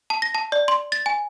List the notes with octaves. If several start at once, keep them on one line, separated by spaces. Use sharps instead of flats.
A5
A#6
A5
D5
C6
A6
G#5